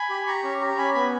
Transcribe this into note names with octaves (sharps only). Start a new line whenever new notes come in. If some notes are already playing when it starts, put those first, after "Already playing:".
Already playing: G#5 B5
G4
G4 A#5 C#6
C#4
G4
A#5
C#4 G#5 B5
B3 G#5 B5